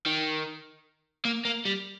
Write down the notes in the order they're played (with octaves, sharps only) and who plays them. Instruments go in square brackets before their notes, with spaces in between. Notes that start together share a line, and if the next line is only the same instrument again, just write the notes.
[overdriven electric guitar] D#3
A#3
A#3
G3